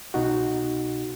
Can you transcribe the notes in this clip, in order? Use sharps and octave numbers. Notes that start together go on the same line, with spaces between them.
C2 B2 D#4 F#4